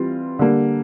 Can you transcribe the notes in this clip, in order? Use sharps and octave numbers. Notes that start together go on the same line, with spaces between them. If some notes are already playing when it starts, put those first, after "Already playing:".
Already playing: E3 G3 C4 F4
D3 G3 A#3